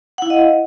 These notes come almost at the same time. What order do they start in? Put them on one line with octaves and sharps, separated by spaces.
F#5 E4 F5 D#5